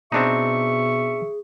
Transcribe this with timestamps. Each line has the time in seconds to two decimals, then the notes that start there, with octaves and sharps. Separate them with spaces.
0.12 B2 C4 D4 D#4 G#4 E5 C#6